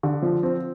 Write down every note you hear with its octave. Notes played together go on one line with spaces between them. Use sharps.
D3
F3
C4